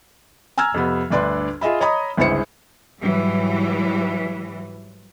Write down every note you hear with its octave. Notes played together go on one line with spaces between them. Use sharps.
G#5 A#5 E6 F6 G#6
F2 C3 B3
G1 D2 D4 B4 D5 C6
F4 G#4 D#5 E5 B5
C#5 D#5 A#5 B5 D#6
G1 C#2 G#3 E4 C5 C#7
G#2 E3 F#3 G3